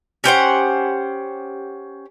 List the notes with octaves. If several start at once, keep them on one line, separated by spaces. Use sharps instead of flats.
C#4 G4 C5 F#5